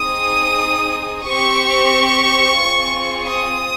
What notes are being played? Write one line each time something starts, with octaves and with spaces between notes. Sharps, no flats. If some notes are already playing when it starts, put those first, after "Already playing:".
Already playing: C4 D#4 G#4 D#6
C4 G4 C#6
C4 F4 G#4
D#6